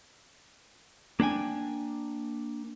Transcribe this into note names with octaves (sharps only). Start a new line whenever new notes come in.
A#3 D4 G5 G#5